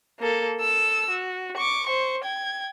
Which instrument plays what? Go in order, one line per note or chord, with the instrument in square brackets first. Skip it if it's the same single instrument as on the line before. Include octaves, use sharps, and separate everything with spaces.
[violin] A#3 A4
A4 E6
F#4
C#6 D6
C5 C#6
G5 G#6